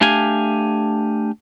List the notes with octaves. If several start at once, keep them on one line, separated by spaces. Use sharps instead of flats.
A3 D4 G4 F5 G#5